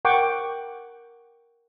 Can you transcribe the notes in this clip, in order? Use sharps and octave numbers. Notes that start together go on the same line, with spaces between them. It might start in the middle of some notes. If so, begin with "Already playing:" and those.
A#4 F#5 G5 C#6 D6